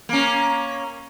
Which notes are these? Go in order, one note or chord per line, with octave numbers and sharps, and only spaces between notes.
A#3 C#4